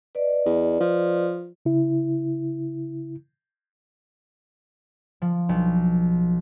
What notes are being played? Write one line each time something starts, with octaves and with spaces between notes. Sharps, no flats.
B4 D5 D#5
E2
F3
C#3 E4
F3
B1